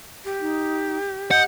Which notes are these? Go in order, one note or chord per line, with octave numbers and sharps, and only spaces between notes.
G4
D#4
D#5 F#5 G6